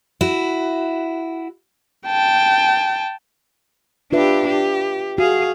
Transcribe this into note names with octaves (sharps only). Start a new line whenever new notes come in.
E4 F#4
G5 A5
D4 F4 G4 B4 E5
G4
F#4 G#4 F5